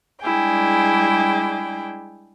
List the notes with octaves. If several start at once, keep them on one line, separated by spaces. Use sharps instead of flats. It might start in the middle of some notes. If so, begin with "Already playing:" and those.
G3 G#3 D4 E4 G#4 G5